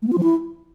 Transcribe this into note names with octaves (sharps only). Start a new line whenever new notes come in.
A3
B3
F4
F3
E4